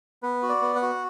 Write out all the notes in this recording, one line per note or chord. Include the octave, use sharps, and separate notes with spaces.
B3 B4
F#4
D5
B3
F#5
F#4